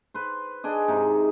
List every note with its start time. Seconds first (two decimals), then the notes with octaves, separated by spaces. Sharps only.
0.14 B4 C5
0.64 D4 G#4 D#5
0.88 G#2 C3 D#4